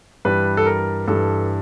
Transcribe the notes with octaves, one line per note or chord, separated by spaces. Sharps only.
G2 E3 G3 B4
A4
A#4
G2 E3 G3 A4